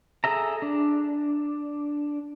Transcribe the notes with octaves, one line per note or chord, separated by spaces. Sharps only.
G#4 A4 E5 A#5
D4